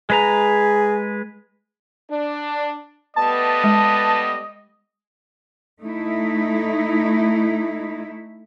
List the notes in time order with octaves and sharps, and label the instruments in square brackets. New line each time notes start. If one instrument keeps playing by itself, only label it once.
[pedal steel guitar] G#3 B4 A#5 [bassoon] G#4
[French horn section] D4
[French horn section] G3 A3 B3 [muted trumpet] D#5 [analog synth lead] A5
[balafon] G#3
[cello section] A3 D#4 E4